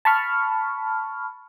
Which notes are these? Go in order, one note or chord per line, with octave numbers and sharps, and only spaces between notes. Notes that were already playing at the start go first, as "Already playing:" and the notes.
A5 B5 C#6 F6